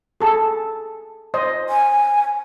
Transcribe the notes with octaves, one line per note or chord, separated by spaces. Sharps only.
G#4 A4 A5
C5 D#5
G#5